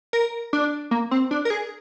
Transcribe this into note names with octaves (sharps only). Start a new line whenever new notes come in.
A#4
D4
A#3
C4
D4
A#4
G#4